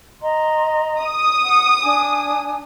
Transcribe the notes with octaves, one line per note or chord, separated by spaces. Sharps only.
D#5 A#5 C6
D#6
F#5
D4 G#5